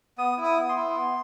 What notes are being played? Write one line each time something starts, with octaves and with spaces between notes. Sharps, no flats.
B3 D#6
E4
D#6
B3
C6
E4
B3